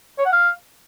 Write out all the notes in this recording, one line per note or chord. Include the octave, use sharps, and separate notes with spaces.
C#5
F#5
F5